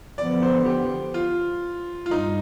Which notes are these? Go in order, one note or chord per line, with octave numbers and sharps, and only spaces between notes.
D3 F3 B3 D5
C5
G4
F4
F4
G2 D#4